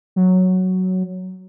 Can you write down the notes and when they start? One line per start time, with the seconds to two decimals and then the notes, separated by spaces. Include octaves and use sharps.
0.16 F#3